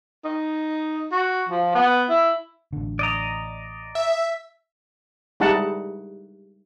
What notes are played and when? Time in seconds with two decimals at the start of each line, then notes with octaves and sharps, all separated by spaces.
0.24 D#4
1.12 F#4
1.49 F3
1.75 B3
2.10 E4
2.73 A1 D3
2.99 D5 D#5 A#5
3.95 E5
5.40 G3 G#3 D#4 E4 F#5 A5